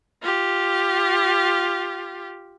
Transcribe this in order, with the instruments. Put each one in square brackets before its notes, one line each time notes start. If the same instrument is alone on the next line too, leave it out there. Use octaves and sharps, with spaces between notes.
[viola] F4 G4